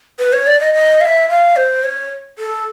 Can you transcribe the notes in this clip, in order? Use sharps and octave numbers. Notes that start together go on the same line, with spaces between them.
B4
C#5
D5
D#5
D#5
F5
E5
F5
C5
C#5
A4